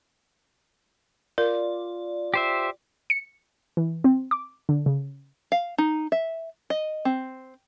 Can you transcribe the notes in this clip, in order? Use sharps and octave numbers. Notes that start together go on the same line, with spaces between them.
F4 A#4 D5
G4 C5 E5
C#7
E3
C4
D6
D3
C#3
F5
D#4
E5
D#5
C4